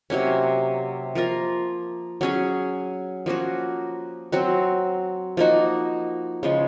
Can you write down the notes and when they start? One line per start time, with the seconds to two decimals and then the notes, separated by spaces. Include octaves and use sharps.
0.10 C3 F#3 A#3 C#4
1.15 F3 A#3 F4 A#4
2.21 F#3 C#4 G#4
3.26 F3 A#3 C#4 F#4
4.32 F#3 C4 F#4
5.37 F3 A#3 D#4 F#4
6.43 C#3 F3 G#3